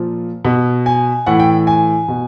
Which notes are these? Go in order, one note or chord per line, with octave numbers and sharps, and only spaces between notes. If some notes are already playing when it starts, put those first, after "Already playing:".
Already playing: A#2 F3
B2
G#5
A2 E3 F#5
G5
G#5
B2